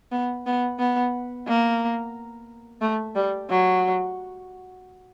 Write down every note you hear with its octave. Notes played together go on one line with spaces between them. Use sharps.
B3
B3
B3
A#3
A3
G3
F#3